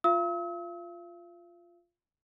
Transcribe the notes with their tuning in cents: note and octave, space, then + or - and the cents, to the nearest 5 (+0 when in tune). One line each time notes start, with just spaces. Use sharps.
F4 +0 F5 -40 E6 -45